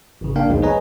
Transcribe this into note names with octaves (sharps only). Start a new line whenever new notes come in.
G#1 C#3
A#3 D4 A#4 F5 G5
A#1 D#2 B2 F3 G#3 D#4
G#4 B4 C#5 D#5 G#5 A#5